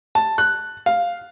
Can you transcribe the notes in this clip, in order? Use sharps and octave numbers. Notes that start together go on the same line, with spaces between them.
A5
F#6
F5